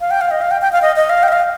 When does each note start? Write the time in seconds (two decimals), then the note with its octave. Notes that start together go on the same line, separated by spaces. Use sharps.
0.01 F5
0.11 G5
0.21 F5
0.31 D#5
0.41 F5
0.51 G5
0.62 G5
0.73 F5
0.82 D#5
0.96 D#5
1.10 F5
1.23 G5
1.28 D#5
1.33 F5